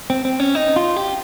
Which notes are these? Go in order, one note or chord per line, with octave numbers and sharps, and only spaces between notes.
C4
C4
C#4
D#4
F4
G4